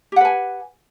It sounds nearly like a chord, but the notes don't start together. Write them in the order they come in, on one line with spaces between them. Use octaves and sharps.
G4 F#5 B4 G#5